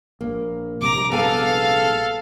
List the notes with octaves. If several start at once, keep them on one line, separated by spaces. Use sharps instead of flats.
A#1 A#3
A#1 C3 G3 A#5 D6
B3 G#4 A4 F5 G#5